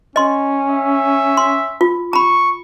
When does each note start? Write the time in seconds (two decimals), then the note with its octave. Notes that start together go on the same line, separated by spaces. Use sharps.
0.16 C#4 D#5 C6
0.70 E5
1.37 C6
1.81 F4
2.13 A#5 B5 C#6